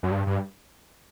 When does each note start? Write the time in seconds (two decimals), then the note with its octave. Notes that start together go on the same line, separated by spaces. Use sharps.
0.03 F#2
0.11 G2
0.27 G2